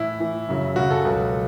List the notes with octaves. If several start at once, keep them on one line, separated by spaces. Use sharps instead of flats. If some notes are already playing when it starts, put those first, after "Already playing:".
Already playing: A2 E3 E4
A2 E3
F#2 C#3 F#3
F#2 C#3 F#3 F#4
A4
C#2 B2 F#3